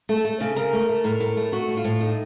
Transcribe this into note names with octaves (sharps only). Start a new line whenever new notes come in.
A3 A4
A3
C#3
C#3 A#4
A3
A3
A2 A#4
A2
A#4
A3
A3 F#4
A2
F4
A2
A3 D#4